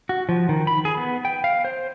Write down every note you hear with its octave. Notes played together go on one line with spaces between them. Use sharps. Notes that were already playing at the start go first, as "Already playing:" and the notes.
F#4
F3
D#3
B5
G#4
B3
G5
F5
C5